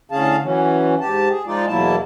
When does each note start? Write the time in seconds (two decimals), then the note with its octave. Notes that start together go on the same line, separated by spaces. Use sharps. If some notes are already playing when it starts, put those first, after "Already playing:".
0.11 A2 D3 C#4 G#4 F5 A5
0.42 E3 F#3 C#4
1.01 G#2 G4 A5
1.30 G#4
1.47 F3 G#3 D#4 F4 D5
1.68 E2 B2 F#3 A#3 E4 A5